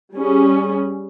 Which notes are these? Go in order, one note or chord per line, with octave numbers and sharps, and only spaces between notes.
G3 C#4 G#4